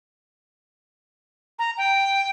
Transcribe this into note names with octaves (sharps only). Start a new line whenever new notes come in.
A#5
G5